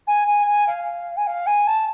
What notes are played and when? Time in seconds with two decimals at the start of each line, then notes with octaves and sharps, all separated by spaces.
0.07 G#5
0.27 G#5
0.46 G#5
0.66 F5
1.16 G#5
1.26 F5
1.46 G#5
1.66 A5